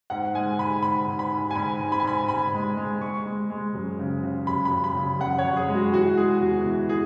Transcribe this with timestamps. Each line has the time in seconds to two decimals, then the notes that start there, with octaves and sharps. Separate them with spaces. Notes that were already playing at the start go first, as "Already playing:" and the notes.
0.10 G#2 F#5
0.35 G#3 G#5
0.59 G#2 B5
0.83 G#2 B5
1.07 G#2
1.19 B5
1.32 G#2
1.51 G#5
1.55 G#2 B5
1.80 G#2
1.92 B5
2.00 G#5
2.04 G#2 B5
2.29 G#2 B5
2.53 G#3
2.77 G#3
3.01 G#3 C#6
3.26 G#3
3.50 G#3
3.74 F#2
3.99 C#3
4.24 C#3
4.47 F#2 B5
4.65 B5
4.71 F#2
4.84 B5
4.96 C#3
5.19 F#2 F#5
5.39 C#5
5.45 F#2
5.56 G#4
5.68 G#3
5.75 F#4
5.93 E3 F#4
6.17 G#3 G#4
6.41 E2 F#4
6.66 E3
6.89 E3 G#4